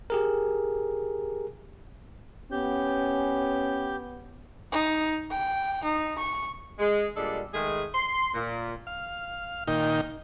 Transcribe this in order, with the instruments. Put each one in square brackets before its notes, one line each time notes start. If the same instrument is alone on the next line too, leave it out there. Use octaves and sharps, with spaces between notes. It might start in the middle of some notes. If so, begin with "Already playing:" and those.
[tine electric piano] G4 G#4 A#4
[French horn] B3 [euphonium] C#4 [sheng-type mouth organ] G4 G6
[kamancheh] D#4
G5
D#4
C#6
[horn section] G#3
A#2 G3 G#3 D4 A4
D#3 G#3 A3 G#4
C6
A#2
[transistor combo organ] F5
A#2 D#3 D#4 G5